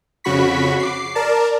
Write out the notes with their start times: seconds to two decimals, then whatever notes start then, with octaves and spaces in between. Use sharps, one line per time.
0.24 F2 C#3 F#4 B5 C#6 B6
0.79 D6 C7
1.15 A#4 D5 A5